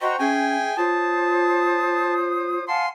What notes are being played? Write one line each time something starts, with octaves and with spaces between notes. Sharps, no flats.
F#4 C5 D#5 G5 A#5 C#6
C#4 G#4 E5 G5 G#5
F4 C5 C#5 A5 D#6
F5 F#5 G#5 A5 C6